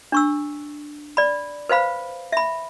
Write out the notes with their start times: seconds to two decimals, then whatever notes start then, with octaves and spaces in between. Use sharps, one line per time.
0.12 D4 C#6 E6
1.17 D5 B5
1.69 B4 C5 F5 B5
2.32 E5 B5